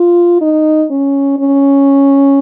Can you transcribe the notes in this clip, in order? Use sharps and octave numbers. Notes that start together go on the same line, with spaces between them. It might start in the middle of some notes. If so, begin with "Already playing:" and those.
Already playing: F4
D#4
C#4
C#4